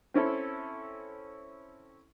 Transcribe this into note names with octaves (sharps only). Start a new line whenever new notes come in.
C4 C#4 E4 A4